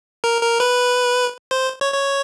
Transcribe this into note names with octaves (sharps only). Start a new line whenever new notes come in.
A#4
A#4
B4
C5
C#5
C#5